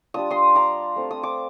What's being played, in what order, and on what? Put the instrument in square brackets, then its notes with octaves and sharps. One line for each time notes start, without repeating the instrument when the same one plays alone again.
[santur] G3 D4 F4 D#6
C6 D#6
A#5 D6
A3 C4 F4
D#6
D6